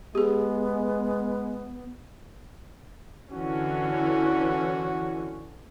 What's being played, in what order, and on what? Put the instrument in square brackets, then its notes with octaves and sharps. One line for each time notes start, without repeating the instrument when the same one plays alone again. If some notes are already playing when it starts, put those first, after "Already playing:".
[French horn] G#3 [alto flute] B3 [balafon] G4 G#4
[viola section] D3 E3 C#4 [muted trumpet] F#4